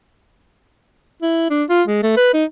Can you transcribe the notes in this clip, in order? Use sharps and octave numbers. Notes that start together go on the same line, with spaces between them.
E4
D4
F4
G#3
A3
B4
D#4